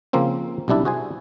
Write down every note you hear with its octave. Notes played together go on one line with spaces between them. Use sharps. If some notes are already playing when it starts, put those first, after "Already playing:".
C#3 F3 A#3 C4 C#4
B1 C3 G3 D4 E4 D5
F#4 G#4 C5 G#5